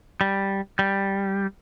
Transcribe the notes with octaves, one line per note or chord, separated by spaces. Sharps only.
G3
G3